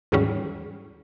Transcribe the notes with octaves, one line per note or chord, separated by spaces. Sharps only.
D#2 G#2 E3 F#3 G3 C#4